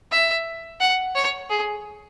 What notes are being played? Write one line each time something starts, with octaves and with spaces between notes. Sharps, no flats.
E5
F#5
C#5
G#4